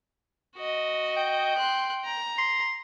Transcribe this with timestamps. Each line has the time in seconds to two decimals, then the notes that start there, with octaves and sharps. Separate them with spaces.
0.57 F#4 D#5
1.17 G5
1.58 C6 F#6
2.04 A#5
2.38 C6